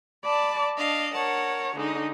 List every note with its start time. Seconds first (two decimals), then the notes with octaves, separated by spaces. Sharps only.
0.24 D5 A5 B5
0.78 D4 D#5 F5
1.13 A#4 C#5 F#5 A5
1.76 D3 G#3 D#4 D#5